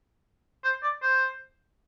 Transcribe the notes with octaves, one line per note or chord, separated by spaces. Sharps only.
C5
D5
C5